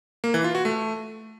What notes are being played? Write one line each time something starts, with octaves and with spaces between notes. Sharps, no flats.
A#3
E3
F4
F#4
A3